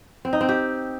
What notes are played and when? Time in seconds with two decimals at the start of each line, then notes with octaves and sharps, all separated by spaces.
0.25 C4
0.33 D#4
0.41 C4
0.49 G4